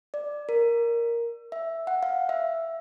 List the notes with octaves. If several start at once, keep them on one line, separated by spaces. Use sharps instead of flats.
D5
A#4
E5
F#5
F5
E5